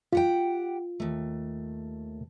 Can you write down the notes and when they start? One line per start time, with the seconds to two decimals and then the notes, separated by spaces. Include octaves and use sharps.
0.13 F4 G4 F#5 G5
1.00 D#2 A3